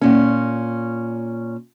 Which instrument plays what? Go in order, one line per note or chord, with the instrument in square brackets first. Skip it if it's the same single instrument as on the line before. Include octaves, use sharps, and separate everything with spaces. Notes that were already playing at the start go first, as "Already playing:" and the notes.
[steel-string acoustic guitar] A#2 C#4